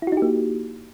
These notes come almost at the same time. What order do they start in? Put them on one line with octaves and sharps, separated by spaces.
E4 F#4 D#4 G4 A#3